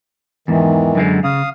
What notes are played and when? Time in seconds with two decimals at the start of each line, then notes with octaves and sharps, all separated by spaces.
0.48 E2 G#2 D#3 E3
0.95 F#2 D3 G#3
1.24 C#3 F5 D#6